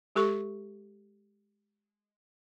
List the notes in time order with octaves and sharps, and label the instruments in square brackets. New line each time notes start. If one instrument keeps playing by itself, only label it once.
[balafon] G#3 G4 A4 C#6